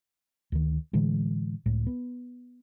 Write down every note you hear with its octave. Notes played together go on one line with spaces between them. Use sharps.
D2 D#3
A2 D3 E3 G#3
C#2 A2
B3